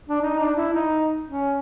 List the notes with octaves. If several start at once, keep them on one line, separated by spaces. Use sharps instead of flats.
D4
D#4
D4
E4
D#4
C#4